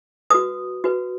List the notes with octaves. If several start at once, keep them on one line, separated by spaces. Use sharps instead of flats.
F#4 B4 D#6
F#4 B4